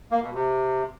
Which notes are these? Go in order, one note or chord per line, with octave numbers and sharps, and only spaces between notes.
A#3
B2
C3